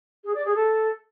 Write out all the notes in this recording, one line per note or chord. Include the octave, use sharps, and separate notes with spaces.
G#4
D5
G#4
A4